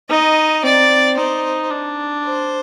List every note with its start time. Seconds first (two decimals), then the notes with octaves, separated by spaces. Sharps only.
0.09 D#4 D#5
0.64 C4 D5
1.17 D#4 C5
1.71 D4
2.25 C5